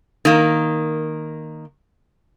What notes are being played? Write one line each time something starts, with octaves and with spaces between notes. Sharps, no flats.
D#3 A#3